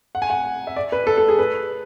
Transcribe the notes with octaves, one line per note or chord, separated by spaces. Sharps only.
F#5
G#5
F#5
E5
D5
B4
A4
A4
G#4
B4